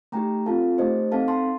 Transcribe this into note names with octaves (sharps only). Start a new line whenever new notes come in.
A3 D#4 G4 G5 A#5
C4 F4 A4 F5 A5
A3 D#4 G4 C5 D#5
C4 D#4 A4 F5 A5
A5 C6